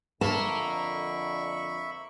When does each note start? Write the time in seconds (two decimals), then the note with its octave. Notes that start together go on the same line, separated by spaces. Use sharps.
0.21 F2 D3 A#3 E5 A5 B5 C#6